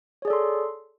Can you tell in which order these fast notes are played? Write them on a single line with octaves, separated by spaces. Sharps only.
C#5 G#4 D5 A4 C6